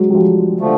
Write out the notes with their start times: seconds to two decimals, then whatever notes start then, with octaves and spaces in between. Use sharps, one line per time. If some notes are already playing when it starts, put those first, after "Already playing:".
Already playing: F#3 G#3
0.10 F#3
0.15 F3 G3
0.60 D3 F3 A3